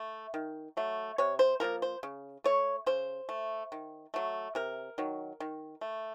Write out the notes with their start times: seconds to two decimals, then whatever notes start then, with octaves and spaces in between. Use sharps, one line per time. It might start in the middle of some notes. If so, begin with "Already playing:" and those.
Already playing: A3
0.34 D#3
0.77 F#3 A3
1.18 C3 C#5
1.39 C5
1.60 F3 A#3 A#4
1.82 C5
2.03 C#3
2.44 A3 C#5
2.86 C#3 C5
3.29 A3
3.72 D#3
4.14 F#3 A3
4.55 C3 A#4
4.98 D#3 F#3
5.40 D#3
5.81 A3